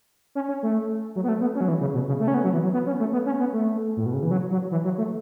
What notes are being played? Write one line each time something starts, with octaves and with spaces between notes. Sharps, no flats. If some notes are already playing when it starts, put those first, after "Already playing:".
C#4
C#4
A3
F#3
B3
A3
B3
C#4
F#3
E3
C#3
B2
C#3
A3
C#4
B3
F#3
E3
F#3
B3
C#4
A3
B3
C#4
B3
A3
A2
B2
C#3
E3
F#3
F#3
E3
F#3
A3